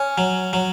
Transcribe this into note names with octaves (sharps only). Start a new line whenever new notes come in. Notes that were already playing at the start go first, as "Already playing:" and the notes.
Already playing: C#4
F#3
F#3